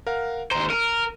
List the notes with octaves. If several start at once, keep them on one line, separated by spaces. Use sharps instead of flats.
A#4 F5 F#5
D#2 C5 A#5
A#4 D#7